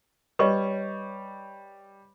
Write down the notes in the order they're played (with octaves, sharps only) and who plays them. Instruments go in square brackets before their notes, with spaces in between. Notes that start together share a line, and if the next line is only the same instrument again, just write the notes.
[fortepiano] G3 C#6 [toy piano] B4 C#5 D#5